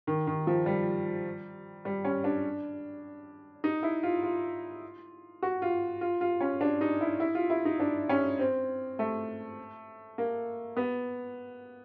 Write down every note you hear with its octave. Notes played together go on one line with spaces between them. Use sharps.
D#3
D#3
F3
G3
G3
C#4
D4
D#4
E4
F4
F4
F#4
F4
F4
F4
C#4
D4
D#4
E4
E4
F4
E4
D#4
D4
C#4
C4
A3
A#3
B3